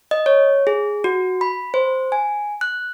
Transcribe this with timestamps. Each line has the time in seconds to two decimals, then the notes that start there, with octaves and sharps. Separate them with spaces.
0.11 D#5
0.26 C#5
0.67 G#4
1.04 F#4
1.41 B5
1.74 C5
2.12 G#5
2.61 F#6